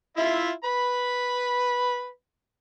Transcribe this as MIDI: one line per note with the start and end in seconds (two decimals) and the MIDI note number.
0.17 0.51 64
0.17 0.51 65
0.17 0.51 76
0.64 2.09 71
0.64 2.09 83